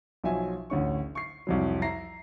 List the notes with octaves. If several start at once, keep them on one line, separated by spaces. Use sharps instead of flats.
B1 F3 F#3 E5 G#5
A1 D2 C#4 C#6
C#6 C7
C2 F2 F#3
E5 A#5 A#6 C7